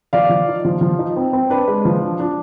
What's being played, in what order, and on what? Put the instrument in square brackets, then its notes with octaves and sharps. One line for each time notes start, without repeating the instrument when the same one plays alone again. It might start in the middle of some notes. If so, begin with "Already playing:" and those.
[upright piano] F3 D5 F5
F3
D#4
F3
F3
D#4
C4
C4
D4 B4
G#3
F3
D4
D4